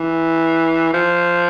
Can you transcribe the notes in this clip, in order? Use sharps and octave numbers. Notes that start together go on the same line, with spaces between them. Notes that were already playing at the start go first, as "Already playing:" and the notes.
Already playing: E3
F3